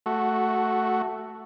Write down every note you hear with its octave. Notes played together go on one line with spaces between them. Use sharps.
A3 F#4